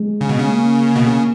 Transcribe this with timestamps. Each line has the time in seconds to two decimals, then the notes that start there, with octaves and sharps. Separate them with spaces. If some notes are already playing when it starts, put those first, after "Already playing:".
Already playing: G#3
0.21 C#3
0.29 B2
0.39 C#3
0.49 A#3
0.95 B2
1.06 C#3